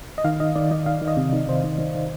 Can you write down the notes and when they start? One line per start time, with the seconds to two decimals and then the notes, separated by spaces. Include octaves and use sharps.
0.18 D#5
0.24 D#3 F5
0.40 D#3 D#5
0.56 D#3 D5
0.71 D#3 D#5
0.86 D#3 F5
1.01 D#3
1.08 D#5
1.17 C3
1.33 D#3
1.48 C3 C5
1.64 D#3
1.78 D#3
1.95 D#3